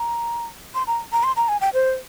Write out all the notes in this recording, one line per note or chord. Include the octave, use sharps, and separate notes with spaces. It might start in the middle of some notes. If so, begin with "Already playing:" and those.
Already playing: A#5
C6
A#5
A#5
C6
A#5
G#5
G5
C5